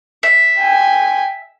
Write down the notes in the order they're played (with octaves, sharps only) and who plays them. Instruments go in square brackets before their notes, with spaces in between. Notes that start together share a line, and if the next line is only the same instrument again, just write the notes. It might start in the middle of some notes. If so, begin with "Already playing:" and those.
[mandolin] E5
[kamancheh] G5 G#5